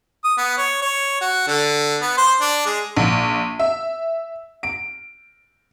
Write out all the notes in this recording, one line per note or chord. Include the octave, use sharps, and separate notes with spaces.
D#6
B3
C#5
C#5
F#4
D3
B3
C5
D4
G#3
A#1
E5
D7